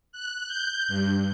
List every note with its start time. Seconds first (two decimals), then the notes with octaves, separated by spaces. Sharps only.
0.12 F#6
0.47 G6
0.88 G2